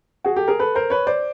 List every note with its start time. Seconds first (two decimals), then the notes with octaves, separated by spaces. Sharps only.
0.24 F#4 G#4
0.36 G4 A4
0.48 G#4 A#4
0.60 A4 B4
0.75 A#4 C5
0.90 B4 C#5
1.07 C5 D5